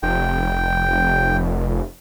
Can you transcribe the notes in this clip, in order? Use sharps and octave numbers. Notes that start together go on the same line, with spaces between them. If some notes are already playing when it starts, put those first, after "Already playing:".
F1 G5